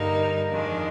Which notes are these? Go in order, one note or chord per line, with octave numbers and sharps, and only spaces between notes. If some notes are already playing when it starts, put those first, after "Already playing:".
Already playing: G2 D3 G3 A#3 D#4
F2 D#3 G#3 D4